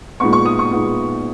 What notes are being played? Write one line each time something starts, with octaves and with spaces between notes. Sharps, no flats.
A#2 G#3 B3 D#4 C#6
C#6
D#6
C#6
A#2 G#3 B3 D#4